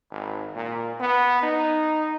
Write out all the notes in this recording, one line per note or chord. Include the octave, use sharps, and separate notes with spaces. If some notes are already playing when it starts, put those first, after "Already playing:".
G#1
A#2
B3
D#4